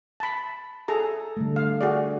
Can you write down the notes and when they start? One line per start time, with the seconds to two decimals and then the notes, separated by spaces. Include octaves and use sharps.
0.20 A5 B5
0.88 G#4 A4 A#5
1.37 D3 G3 A3
1.56 F5
1.81 F#4 G#4 D5